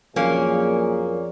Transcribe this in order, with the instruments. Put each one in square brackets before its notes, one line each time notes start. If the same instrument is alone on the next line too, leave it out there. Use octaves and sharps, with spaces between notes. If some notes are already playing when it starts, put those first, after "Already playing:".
[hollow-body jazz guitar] F2 F#3 [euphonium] A#2 [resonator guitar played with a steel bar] A#3 C#4 [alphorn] G#4